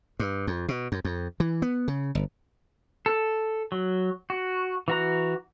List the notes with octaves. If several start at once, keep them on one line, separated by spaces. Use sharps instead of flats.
G2
F2
B2
F#2
F2
E3
B3
C#3
G1
A4
F#3
F#4
E3 F#4 A#5